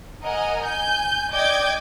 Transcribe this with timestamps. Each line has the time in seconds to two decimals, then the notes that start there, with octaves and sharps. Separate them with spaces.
0.23 A#4 D#5 F#5 G#5 A#5
0.64 G#5 G6
1.30 D5 D#5 G5 D6 G6 G#6